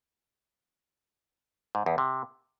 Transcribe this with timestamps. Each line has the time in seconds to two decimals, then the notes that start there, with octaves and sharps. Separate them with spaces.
1.75 G#2
1.86 E2
1.98 C3